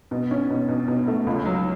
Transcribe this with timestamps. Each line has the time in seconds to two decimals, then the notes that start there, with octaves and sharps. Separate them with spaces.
0.11 B2
0.31 C#4
0.50 B2
0.69 B2
0.88 B2
1.07 A3
1.27 C#2
1.45 F#3